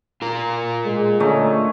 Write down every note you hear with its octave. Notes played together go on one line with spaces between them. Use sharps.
F4 A#4
G#3
D3 A3 C#4 D#4